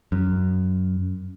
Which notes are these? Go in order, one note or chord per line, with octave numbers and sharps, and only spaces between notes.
F#2